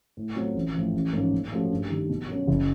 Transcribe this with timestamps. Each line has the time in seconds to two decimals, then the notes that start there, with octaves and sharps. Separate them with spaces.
0.17 A2
0.35 F#3 A3 C4 F4
0.55 A1
0.74 A2 F3
0.94 A1
1.13 G#2 F3 A#3 C#4
1.33 A#2
1.52 F3 A3 C#4 F#4
1.71 G2
1.90 D#3 G3
2.09 B2
2.28 F#3 A#3 C#4
2.47 F#1